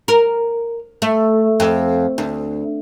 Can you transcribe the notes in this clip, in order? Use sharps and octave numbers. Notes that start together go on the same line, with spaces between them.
A#4
A3
F2
D2